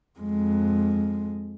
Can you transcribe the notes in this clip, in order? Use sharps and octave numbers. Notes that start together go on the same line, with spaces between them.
F2 G#3